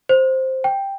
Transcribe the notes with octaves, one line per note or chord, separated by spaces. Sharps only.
C5
G5